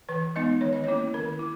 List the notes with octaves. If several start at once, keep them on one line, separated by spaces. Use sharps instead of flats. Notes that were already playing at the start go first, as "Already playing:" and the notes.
E3 B4
G#3 B3 D#4 D#5
D#3 C#5
D#5
A#3 C#4 E4 C#5
D#3 A#4
E4